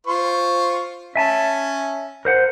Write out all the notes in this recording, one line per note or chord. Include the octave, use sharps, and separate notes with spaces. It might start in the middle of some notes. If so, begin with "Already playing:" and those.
F4 C5 C#6
C#4 E5 G#5 A5
A#4 C5 F#5